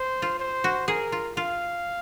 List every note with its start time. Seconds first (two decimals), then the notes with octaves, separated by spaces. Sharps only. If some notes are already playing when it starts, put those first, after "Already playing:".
Already playing: C5
0.22 F4
0.39 C5
0.64 F#4
0.88 G#4 A#4
1.12 F4
1.37 F4 F5